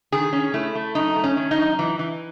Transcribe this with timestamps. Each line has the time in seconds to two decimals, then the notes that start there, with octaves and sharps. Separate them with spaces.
0.12 D#3 G#4
0.33 C#4
0.54 A3 E4
0.75 A3
0.95 F#2 D#4
1.16 A3
1.24 C#4
1.37 D#3
1.51 D#4
1.58 F#2
1.79 E3
1.99 E3